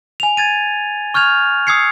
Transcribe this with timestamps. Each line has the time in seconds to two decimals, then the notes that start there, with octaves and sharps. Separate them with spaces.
0.20 G#5 F7
0.37 G#6 A6 D#7
1.14 C#6 F6 G6 G#6 F7
1.67 D#6 E6 G#6 C7 C#7